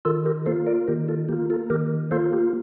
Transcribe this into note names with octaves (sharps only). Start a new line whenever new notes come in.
D#3 F4 A4
G4 A#4
A#3 F4 A4 C5
A#4 D5
D#3 G4 A#4
F4 A4
A#3 F4 G4
F4 A4
D#3 G4 A#4
A#3 F4 A4 C5
G4